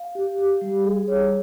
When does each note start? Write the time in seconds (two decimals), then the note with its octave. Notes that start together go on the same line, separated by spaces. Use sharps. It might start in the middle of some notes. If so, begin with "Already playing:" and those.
Already playing: F5
0.15 G4
0.38 G4
0.61 G3
0.84 G#4
1.08 C#5